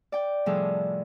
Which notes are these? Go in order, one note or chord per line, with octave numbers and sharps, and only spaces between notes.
D5 G5
A2 C3 F3 G3 G#4 A4